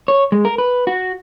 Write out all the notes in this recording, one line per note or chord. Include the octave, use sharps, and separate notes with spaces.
C#5
G#3
A#4
B4
F#4